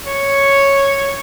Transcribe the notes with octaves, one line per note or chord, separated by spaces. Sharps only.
C#5